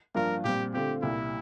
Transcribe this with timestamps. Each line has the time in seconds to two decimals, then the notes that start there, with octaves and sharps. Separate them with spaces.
0.15 G2 F3 A#3 D4 F4 A#4
0.44 A#2 G3 C4 G4
0.73 D3 A3 C4 F4 G4
1.02 C2 A#2 G3 E4